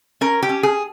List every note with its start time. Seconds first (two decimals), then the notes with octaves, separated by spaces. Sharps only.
0.21 C#4 A#4
0.42 G4
0.49 C#4
0.63 G#4